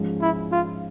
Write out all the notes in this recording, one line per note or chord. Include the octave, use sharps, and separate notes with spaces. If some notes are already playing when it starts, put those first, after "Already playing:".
Already playing: G#2 F3 G#3 C#4
E4
F4